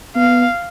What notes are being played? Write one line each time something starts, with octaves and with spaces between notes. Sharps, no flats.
B3 F5